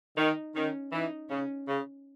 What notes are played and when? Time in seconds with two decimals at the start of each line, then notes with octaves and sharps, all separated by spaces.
0.17 D#3 D#4
0.55 D#3 C#4
0.92 E3 D#4
1.29 C#3 C#4
1.66 C#3